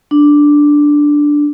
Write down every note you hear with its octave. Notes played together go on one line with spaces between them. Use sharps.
D4